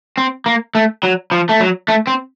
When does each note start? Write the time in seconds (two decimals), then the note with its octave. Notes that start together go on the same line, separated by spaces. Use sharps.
0.18 C4
0.46 A#3
0.75 A3
1.03 F#3
1.31 F3
1.49 A3
1.60 F#3
1.88 A3
2.07 C4